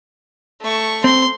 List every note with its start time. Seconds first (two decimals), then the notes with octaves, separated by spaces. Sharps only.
0.62 A3 C#6
1.04 C4 C6